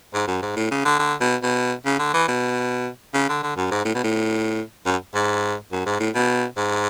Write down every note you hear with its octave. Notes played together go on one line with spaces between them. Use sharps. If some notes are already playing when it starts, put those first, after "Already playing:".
G#2
F#2
G#2
A2
C#3
D3
D3
B2
B2
C#3
D3
E3
B2
C#3
D3
D3
F#2
G#2
A2
B2
A2
F#2
G#2
F#2
G#2
A2
B2
G#2